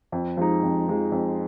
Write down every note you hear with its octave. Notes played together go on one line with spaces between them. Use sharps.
F2
F3 G#3 D#4
F2
F3 G#3 D#4
F2